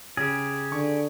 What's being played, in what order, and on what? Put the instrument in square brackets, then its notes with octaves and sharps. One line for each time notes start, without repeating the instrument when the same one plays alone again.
[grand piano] C#3 [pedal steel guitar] G4 G#4
[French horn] D3 [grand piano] C#6